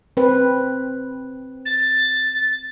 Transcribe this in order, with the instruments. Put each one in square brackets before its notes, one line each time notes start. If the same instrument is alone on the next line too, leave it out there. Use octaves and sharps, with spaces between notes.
[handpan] C4 B4
[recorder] A6